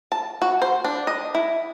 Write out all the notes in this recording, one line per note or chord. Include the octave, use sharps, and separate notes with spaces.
A5
F#4
C5
D4
D#5
E4